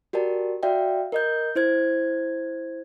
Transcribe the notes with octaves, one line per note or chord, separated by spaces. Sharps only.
F#4 G4 A#4 D5 A5
F#4 D5 E5 F5 G5
A#4 D#5 G6
E4 C5 G#6